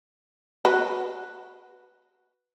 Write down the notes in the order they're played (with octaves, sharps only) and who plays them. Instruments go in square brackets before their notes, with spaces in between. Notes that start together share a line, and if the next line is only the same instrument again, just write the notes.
[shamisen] F#4 B4